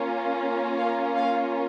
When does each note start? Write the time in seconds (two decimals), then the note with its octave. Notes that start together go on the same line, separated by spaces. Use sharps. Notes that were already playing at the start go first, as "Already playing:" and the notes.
Already playing: A#3 C#4 F4
0.77 F5
1.17 F5